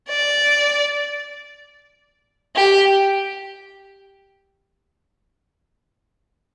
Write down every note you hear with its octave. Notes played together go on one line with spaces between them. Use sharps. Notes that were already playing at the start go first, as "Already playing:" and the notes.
D5
G4